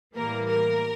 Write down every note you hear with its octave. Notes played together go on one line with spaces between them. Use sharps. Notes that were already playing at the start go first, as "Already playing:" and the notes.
A2 E3 G3 A#3 A#4
A#4